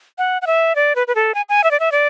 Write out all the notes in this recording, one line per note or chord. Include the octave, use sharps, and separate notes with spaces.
F#5
F#5
E5
D5
B4
B4
A4
G#5
G#5
E5
D5
E5
D5